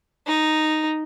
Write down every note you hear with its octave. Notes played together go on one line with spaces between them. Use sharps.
D#4